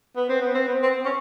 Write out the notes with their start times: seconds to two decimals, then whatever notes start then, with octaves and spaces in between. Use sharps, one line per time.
0.16 B3
0.29 C4
0.41 B3
0.55 C4
0.68 B3
0.82 C4
1.05 C#4